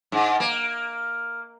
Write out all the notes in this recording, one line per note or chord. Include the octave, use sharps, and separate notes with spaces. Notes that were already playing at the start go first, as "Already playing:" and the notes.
G#2
A#3